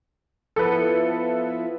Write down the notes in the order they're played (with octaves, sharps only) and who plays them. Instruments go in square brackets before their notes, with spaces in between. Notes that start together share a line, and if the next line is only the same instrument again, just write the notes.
[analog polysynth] F3 B3 E4 [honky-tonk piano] A4 B4